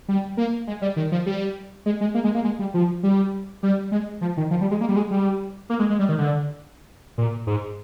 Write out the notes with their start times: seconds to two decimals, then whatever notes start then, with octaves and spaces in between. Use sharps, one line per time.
0.08 G3
0.37 A#3
0.67 G#3
0.82 G3
0.96 D#3
1.12 F3
1.26 G3
1.86 G#3
2.01 G#3
2.15 A#3
2.24 G#3
2.35 A#3
2.44 G#3
2.59 G3
2.74 F3
3.03 G3
3.63 G3
3.92 G#3
4.21 F3
4.37 D#3
4.51 F3
4.61 G3
4.71 G#3
4.81 A#3
4.89 G3
4.96 G#3
5.11 G3
5.70 A#3
5.79 G#3
5.90 G#3
5.99 G3
6.09 D#3
6.18 D3
7.18 A#2
7.47 G#2